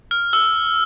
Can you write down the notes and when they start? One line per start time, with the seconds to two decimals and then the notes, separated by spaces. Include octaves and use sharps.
0.11 F6
0.33 E6